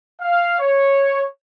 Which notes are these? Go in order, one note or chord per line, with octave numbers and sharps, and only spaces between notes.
F5
C#5